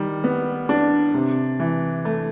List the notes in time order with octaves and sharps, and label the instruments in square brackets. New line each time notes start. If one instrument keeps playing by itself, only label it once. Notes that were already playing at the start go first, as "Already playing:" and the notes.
Already playing: [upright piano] D#3 G3
B3
D4
C3
E3
A3